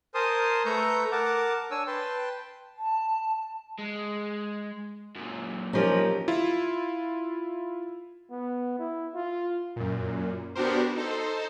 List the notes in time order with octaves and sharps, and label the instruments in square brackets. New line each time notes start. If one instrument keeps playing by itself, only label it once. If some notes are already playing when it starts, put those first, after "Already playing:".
[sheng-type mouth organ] A#4 C5 G#5 A5 C6 D#6
A3 A4 B4 A#5 C#6 G6
A#4 F#5 A5 D6
D4 C#5 G#5 E6
B4 G5 A5 C6
[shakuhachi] A5
[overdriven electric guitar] G#3
F#2 A#2
[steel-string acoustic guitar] F3 C#4 [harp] D#4 G4 A#4
[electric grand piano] E4 F4
[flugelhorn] B3
E4
F4
[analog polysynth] F#2 A#2
B3 D4 F#4 G4 A#4 C5
D#4 A4 C5